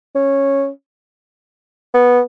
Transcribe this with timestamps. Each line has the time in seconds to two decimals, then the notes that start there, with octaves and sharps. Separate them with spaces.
0.16 C#4
1.94 B3